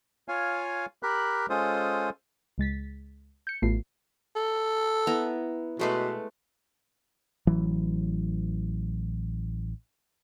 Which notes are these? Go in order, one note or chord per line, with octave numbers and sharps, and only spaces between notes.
F4 C#5 F5 G#5
G4 A#4 B5 F#6
G#3 C#4 F4 A4 C5 D#6
C#2 G#3 A6 B6
G6 C#7
A1 A3 B3 F4 C7
A4
B3 E4 A#5
B2 G#3 A3 B4
A1 E3 F#3